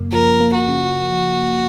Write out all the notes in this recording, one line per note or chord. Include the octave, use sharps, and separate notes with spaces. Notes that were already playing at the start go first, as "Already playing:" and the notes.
Already playing: F#2 C#3 A#3
F3 A#4
A#3
F#4
C#3